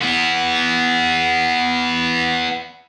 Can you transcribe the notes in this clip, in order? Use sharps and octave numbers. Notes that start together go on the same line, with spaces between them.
B3 E4